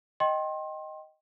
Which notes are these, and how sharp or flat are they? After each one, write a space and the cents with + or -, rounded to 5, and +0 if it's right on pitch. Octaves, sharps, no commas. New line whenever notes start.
D#5 +0 G5 -15 C6 +30